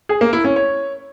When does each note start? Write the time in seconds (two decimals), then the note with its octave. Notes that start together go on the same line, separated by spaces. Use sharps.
0.09 G#4
0.21 A#3
0.33 E4
0.44 C#4
0.56 C#5